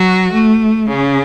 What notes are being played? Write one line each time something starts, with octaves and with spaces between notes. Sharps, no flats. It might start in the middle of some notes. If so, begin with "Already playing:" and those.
Already playing: F#3 F#4
A3
C#3 C#4